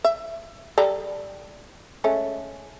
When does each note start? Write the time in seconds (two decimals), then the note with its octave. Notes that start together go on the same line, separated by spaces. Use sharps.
0.04 E5
0.78 G3 A4 D5 A#5
2.04 G#3 A3 C#4